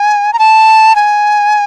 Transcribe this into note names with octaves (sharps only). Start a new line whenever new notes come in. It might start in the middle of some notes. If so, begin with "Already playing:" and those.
Already playing: G#5
A#5
A5
G#5